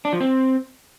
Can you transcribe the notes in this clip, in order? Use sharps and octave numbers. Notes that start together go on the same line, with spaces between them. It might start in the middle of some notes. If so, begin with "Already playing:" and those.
D4
F3
C4